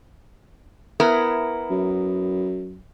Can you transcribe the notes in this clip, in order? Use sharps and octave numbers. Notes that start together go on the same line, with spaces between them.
B3 E4 A#4
F#2